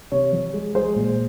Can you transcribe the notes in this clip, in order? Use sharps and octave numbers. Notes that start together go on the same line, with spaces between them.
C3 C#5
F3
G#3
G#3 C5
A#2